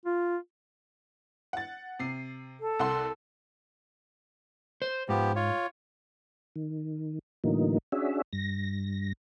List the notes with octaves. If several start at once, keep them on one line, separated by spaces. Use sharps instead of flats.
F4
F#5 A6
C3 C7
A4
C2 F#5 C6
C5
G#2 F3 B3 G4
F4 C#5
D#3
A2 D3 E3 F#3 A#3 D#4
C#4 D4 F#4 G#4 E5
G2 A#6